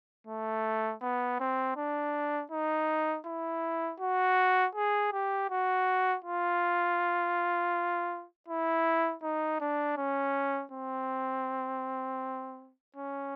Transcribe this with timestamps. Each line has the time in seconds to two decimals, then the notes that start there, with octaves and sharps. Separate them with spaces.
0.27 A3
1.02 B3
1.40 C4
1.76 D4
2.51 D#4
3.26 E4
4.00 F#4
4.75 G#4
5.13 G4
5.50 F#4
6.24 F4
8.48 E4
9.23 D#4
9.60 D4
9.97 C#4
10.72 C4
12.96 C#4